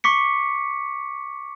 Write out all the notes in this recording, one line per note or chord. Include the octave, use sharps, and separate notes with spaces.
C#6 D6 B6 C#7